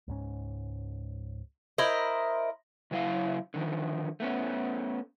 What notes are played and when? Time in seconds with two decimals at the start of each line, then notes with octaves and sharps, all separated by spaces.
0.07 C#2 G#2 C#4
1.78 E4 A#4 C5 D#5
2.91 C#3 F#3 D4 E4 F5
3.54 D3 D#3 F3
4.20 A3 B3 C#4